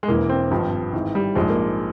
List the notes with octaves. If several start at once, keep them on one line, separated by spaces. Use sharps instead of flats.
G#3
E1 E2 E3 A#3
C4
G#1 G2 F3
G#1 G#2 E3
G3
A#1 G#2 F3 G#3
A#3